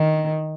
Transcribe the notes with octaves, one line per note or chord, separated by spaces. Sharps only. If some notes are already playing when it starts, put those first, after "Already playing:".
Already playing: D#3